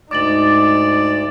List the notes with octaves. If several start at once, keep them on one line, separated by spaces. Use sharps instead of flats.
D2 G#2 D#4 D5 D6 A6 F#7